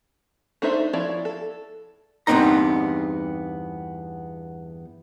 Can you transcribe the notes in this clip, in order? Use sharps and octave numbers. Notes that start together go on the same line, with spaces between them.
A3 D4 D#4 C5 E5
F3 E4 C#5 D5
A4
E2 G2 B3 C4 D#4 A#5